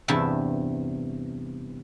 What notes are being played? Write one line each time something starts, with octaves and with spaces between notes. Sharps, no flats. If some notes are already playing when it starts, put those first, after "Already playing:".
E2 G2 C3 E5 A5